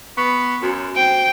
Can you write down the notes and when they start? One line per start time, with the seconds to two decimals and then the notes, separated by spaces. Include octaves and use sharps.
0.17 B3 C#6
0.62 F#2 F#4
0.96 C4 G5